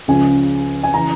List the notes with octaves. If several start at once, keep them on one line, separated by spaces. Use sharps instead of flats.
C#2 C#3 F3 G#5
G#5
C#3 E3 A#5